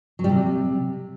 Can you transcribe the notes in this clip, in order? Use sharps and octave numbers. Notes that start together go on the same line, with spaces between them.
F#3
G3
C3